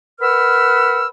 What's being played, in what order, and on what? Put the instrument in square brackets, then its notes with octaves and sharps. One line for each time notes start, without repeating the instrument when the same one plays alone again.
[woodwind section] A#4 B4 F#5 B5 E6 F6